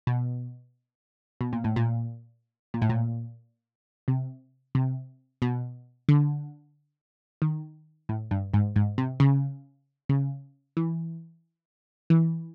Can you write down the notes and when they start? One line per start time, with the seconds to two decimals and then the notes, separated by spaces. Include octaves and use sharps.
0.07 B2
1.41 B2
1.53 A#2
1.64 A2
1.76 A#2
2.74 A#2
2.82 A2
2.89 A#2
4.08 C3
4.75 C3
5.42 B2
6.09 D3
7.42 D#3
8.09 A2
8.31 G2
8.54 G#2
8.76 G#2
8.98 C3
9.20 C#3
10.09 C#3
10.77 E3
12.10 E3